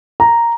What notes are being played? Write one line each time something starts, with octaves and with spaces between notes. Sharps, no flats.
A#5